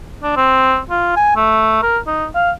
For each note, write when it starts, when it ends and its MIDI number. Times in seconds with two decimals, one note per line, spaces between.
0.23 0.34 62
0.37 0.80 60
0.91 1.12 65
1.16 1.36 80
1.36 1.80 57
1.83 1.99 70
2.07 2.26 63
2.35 2.51 77